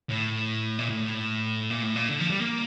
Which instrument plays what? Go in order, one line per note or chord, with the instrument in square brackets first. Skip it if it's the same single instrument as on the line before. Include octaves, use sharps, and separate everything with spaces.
[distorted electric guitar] A2
A#2
A2
A#2
A2
A#2
D3
F3
G3
A#3